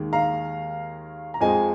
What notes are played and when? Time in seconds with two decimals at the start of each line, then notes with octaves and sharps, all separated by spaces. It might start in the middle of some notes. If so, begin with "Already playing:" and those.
Already playing: D#2 D#3 G#3
0.13 F5 A#5
1.34 A#5
1.41 F2 F3 G#3 D#5 G#5